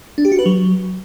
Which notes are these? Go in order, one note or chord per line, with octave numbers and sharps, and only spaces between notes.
D4
G4
F#4
B4
F#3